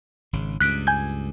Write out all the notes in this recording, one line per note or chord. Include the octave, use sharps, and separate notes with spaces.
G#1 C#3
C#2 G2 F#6 B6 D7
G#5 G6 G#6